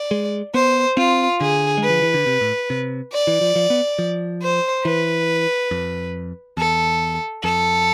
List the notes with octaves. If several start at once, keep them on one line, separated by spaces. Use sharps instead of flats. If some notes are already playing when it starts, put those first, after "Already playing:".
Already playing: D5
G#3
B3 C5
C4 F4
D3 G#4
G#3
B4
F3
E3
D3
C3
A2
C3
D5
E3
F3
F3
B3
F3
C5
E3 B4
F2
E2 A4
F2 A4